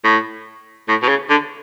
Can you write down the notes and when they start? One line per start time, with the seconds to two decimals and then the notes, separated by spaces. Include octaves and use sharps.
0.04 A2
0.88 A2
1.03 B2
1.09 C#3
1.30 D3